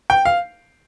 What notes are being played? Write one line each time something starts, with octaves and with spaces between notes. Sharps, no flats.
G5
F5